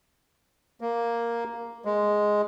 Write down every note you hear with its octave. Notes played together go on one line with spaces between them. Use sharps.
A#3
G#3